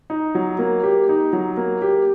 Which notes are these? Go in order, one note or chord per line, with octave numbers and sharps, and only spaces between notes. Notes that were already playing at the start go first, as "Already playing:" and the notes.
D#4
F#3
A#3
G4
D#4
F#3
A#3
G4